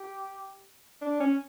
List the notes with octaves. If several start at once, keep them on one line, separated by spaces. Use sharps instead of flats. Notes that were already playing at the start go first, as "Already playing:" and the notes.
Already playing: G4
D4
C#4